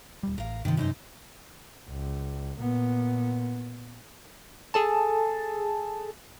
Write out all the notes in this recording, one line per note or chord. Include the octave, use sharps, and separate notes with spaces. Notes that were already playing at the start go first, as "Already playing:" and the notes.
D#1 G3
A1 A#4 F5
G2 C3 D#3 F3
F#2 D#4 C5
C#2
A#2 B3
G#4 A4 A5